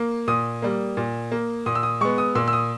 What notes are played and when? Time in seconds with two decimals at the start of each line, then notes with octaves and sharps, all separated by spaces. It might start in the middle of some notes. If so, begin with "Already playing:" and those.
Already playing: A#3
0.28 A#2 D#6
0.62 G3 A#3
0.97 A#2
1.32 A#3
1.66 A#2 D#6
1.75 E6
1.83 D#6
2.01 G#3 B3 C#6
2.18 D#6
2.35 A#2 E6
2.48 E6
2.53 D#6